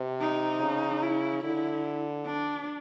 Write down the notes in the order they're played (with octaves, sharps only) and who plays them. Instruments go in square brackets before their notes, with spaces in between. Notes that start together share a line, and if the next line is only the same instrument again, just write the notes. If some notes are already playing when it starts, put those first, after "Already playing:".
Already playing: [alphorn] C3
[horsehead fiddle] D#4
[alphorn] C#3
[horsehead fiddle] E4
[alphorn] D3 [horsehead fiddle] E4
[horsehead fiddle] D4